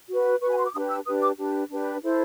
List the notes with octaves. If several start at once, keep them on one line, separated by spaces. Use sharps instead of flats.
F#4 B4
B4 C#6
F#4 G#5
C6
D6
D4 G4 B4 D#6
E6
D4 G4 B4 D#6
D6
D4 G4 B4
D4 G4 B4
E4 A4 C5